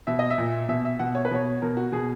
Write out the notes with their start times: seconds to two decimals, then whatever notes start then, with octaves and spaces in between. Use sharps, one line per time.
0.07 B2 E5
0.19 D#5
0.30 E5
0.38 A#2
0.69 B2 E5
0.85 E5
0.99 B2 F#5
1.15 C#5
1.25 B4
1.31 B2 C#5
1.62 B2 A#4
1.77 F#4
1.92 B2 G#4